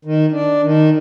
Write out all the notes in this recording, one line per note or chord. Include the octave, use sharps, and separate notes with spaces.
D#3
D4
D#3